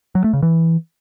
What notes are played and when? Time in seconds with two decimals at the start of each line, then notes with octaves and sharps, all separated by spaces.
0.15 F#3
0.24 A3
0.33 C#3
0.43 E3